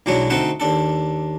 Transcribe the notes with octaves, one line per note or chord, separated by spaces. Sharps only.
B1 E3 F#3 G#3 D4 C#5
D2 C4 D#4 A4 E5 F#5
D#2 D4 A4